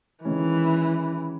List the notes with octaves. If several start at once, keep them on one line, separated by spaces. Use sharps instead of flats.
D#3 E3 G#3 C#4